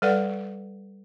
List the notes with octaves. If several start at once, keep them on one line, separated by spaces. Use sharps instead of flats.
G3 A4 B4 D5 F#5